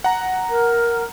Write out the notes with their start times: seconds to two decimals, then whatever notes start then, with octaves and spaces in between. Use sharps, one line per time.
0.04 F#5 A#5
0.50 A#4